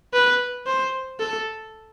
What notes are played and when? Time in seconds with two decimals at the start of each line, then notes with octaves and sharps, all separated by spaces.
0.13 B4
0.66 C5
1.20 A4